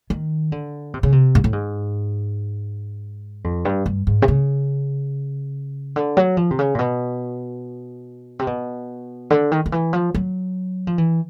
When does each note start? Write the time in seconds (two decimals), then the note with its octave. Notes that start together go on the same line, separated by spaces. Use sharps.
0.10 D#3
0.52 D3
0.94 C3
1.03 C#3
1.12 C3
1.35 G#2
1.44 A2
1.53 G#2
3.44 F2
3.65 G2
3.86 G2
4.07 G#2
4.22 C3
4.28 C#3
5.96 D3
6.17 F#3
6.37 F3
6.51 C3
6.59 C#3
6.75 A#2
6.79 B2
8.39 C3
8.47 B2
9.30 D3
9.52 D#3
9.66 D#3
9.72 E3
9.93 F3
10.15 F#3
10.87 F3
10.98 E3